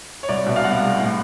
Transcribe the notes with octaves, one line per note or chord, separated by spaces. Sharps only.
C#5
C2 D5
B2 E5
F5
C2 F#5
G#3
A2